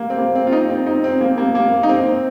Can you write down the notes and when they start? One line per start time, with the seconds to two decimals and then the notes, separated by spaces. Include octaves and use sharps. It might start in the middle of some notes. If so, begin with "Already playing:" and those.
Already playing: A#3
0.10 C4
0.18 A#3
0.35 C4
0.47 F4
0.52 D#4
0.70 C4
0.86 D#4
1.04 C4
1.21 A#3
1.38 A#3
1.55 A#3
1.83 D#4
1.89 C4